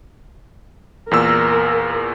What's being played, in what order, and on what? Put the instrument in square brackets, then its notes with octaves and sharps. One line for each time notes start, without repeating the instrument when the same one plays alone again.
[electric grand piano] E2 A#2 E6 [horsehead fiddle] A#4